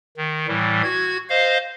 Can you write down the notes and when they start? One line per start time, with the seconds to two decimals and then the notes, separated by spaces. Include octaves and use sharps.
0.17 D#3
0.48 A2 E3 G3
0.83 F#4 G#6
1.29 C5 D#5 F5